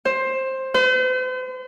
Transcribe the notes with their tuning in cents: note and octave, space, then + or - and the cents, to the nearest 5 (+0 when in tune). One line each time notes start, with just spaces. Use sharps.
C5 +15
C5 -45